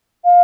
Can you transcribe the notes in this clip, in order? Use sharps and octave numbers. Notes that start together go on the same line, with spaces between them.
F5